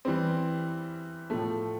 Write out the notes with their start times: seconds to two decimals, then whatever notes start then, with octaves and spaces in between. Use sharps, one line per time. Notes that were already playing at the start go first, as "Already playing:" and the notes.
0.05 E3 G3 C4
1.30 A2 F3 A3